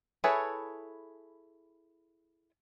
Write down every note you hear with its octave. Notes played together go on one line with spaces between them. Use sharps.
E4 G#4 A4 B4 C#5